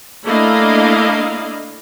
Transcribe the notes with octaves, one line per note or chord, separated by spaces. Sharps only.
A3 A#3 D4 E4 D#5 F5